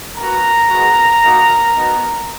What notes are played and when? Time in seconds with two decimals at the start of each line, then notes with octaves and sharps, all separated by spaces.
0.18 B3 F#4 A#4 A#5
0.70 G#3 B3 F#4
1.21 A#3 D#4 F#4
1.74 B3 D#4 F#4